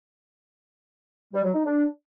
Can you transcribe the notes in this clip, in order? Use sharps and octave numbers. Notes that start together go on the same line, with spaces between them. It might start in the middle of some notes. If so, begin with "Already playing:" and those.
G3
F#3
D#4
D4